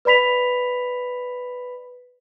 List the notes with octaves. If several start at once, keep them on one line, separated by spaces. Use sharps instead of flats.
B4 D5 B5 B6 F7